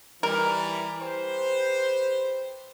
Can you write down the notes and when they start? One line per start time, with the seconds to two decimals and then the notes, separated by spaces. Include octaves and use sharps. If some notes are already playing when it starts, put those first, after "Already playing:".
0.23 E3 G3 A#4
1.01 G4 B4 C5